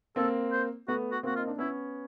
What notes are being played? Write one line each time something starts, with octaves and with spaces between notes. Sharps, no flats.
A#3 C4 A4
C5
A3 B3 F#4
F#4
A#3 C4 F#4
D#4 F4
D4
B3 C#4 E4